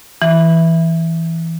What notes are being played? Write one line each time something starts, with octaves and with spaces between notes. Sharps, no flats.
E3